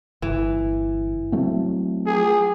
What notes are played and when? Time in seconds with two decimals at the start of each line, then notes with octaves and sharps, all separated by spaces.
0.22 G1 E3
1.32 F#3 A3 C4
2.06 G#4